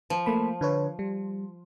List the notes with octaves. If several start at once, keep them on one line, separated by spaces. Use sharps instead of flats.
F3
A3 A#3 B5
D3 B4 C#5
G3